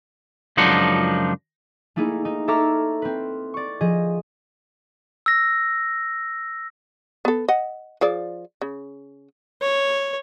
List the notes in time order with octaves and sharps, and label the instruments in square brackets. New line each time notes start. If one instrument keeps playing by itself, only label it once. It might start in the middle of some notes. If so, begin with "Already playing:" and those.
[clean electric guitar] C#2 F#2 F3 D4 D#4 F#5
[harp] A3 A#3 D#4 E4 G#4
D#4
A4 C#5 E5 A#5 D6 F6
C4 B4
D5 C#6
F3 G#4 D#5
[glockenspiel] E6 A#6
[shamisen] B3 A4
D#5 F#5
F3 G#4 D5
C#3
[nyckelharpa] C#5